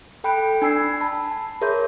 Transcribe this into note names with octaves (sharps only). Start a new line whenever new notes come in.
A4 G5 B5 F#6 D7
D4 G#5 E6 C7
A5 B5
G#4 A#4 C#5 E5 C6 G6